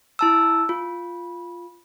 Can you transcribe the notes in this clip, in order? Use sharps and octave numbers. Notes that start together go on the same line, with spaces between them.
E4 A5 E6
F4